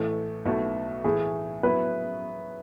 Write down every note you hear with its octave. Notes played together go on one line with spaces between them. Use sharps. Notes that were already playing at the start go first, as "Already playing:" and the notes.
Already playing: A1 A2 E3 A3 A4
B1 B2 A3 E4
A2 E3 A3 E4 G#4
F#3 B3 E4 B4